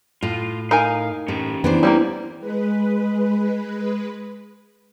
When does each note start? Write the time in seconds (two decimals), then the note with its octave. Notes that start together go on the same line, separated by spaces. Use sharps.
0.23 A2 F4
0.71 D#4 A#4 F5 G#5
1.28 A2 C#4 G4
1.64 E3 B3 D4 C5
1.83 G3 G#3 A#3
2.40 G#3 B4